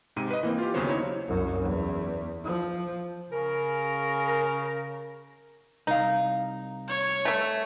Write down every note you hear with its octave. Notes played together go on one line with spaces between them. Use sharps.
G#2 C3 D#7
B4 D#5
E3 A#3 C4
F4 G4
D#2 C#3 F#3 B3 C5 C#5
D#4 E4 C#5
C2 F#2
E2
F3
C#3 A#4
C2 D#4 F5
C#5
A3 E5